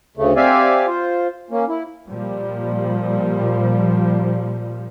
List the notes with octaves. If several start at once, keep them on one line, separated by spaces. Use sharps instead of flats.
D2 C#3 A3
C4 G4 D5 E5 F5 G#5
F4 C5
A#3 C#4
E4
A#2 F3 G3